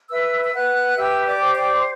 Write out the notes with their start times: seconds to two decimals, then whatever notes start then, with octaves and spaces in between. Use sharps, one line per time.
0.10 B4 E5 E6
0.44 E6
0.53 B4 F#5 F#6
0.97 G4 E5 E6
1.25 D5 D6
1.40 C5
1.54 D5 D6
1.73 C6